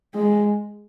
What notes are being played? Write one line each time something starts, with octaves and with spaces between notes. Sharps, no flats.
G#3